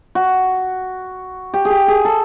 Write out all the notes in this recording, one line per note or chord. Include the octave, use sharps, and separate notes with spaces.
F#4
G4
G#4
G4
G#4
A4